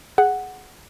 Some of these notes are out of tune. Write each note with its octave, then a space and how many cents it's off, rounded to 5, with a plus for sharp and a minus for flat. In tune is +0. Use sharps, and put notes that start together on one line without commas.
G#4 +0 F#5 +0